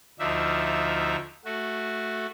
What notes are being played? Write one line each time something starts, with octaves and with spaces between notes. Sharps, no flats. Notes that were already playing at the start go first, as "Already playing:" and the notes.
D2 F3 D4 D#4 E5
A3 F#4